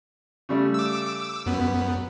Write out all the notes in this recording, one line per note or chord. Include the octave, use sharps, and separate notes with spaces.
C#3 G3 A3
D6 E6
F#2 B3